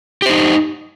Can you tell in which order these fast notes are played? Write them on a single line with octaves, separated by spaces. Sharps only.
G4 C5 D#4